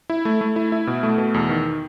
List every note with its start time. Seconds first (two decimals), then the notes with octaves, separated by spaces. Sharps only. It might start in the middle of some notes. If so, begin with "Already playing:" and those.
0.10 E4
0.25 A3
0.41 A3
0.56 E4
0.72 E4
0.87 B2
1.03 A3
1.18 B2
1.34 E2
1.49 D#3